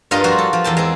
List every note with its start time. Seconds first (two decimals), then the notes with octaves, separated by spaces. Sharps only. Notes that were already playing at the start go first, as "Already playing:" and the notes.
0.11 G2 G3 F4 A#4 D#5
0.24 F3 G3 F#4 C5
0.38 A4
0.53 F3
0.64 E2 A#3 G5 A5
0.77 G#3 C4